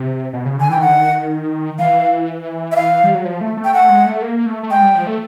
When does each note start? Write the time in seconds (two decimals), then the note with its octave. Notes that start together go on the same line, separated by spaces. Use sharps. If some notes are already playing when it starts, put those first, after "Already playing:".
Already playing: C3
0.33 B2
0.45 C#3
0.58 D3 G#5
0.70 E3 G5
0.78 D#3
0.81 D3 F#5
0.94 D#3
1.79 E3 F5
2.72 E5
2.76 F5
3.04 G3
3.14 F#3
3.25 F3
3.41 A3
3.57 A3
3.65 G5
3.74 A3 F#5
3.89 G#3
4.06 A3
4.22 A#3
4.46 A3
4.63 A3
4.71 G#3 G5
4.82 G3
4.95 F3
5.07 A3